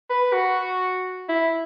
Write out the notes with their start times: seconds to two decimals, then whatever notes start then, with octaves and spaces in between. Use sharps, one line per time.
0.10 B4
0.33 F#4
1.29 E4